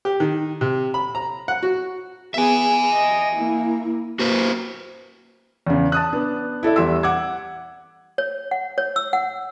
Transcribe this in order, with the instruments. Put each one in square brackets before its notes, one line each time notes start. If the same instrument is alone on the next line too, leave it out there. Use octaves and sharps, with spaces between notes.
[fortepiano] G4
D#3
C3
B5
A#5
F#5
F#4
[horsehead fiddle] B3 G#4 [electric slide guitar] E5 G#5
[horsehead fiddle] D#5
A#3 E4
[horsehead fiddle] A#3 [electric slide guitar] F#4 B4 C5
[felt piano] E2 C#3
A5 D#6 F#6
B3 D4
E4 A4 D5 E5
E2 G3 E5 C6 E6
F#5 D6 E6 G#6
[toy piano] C#5
F#5
C#5
E6
F#5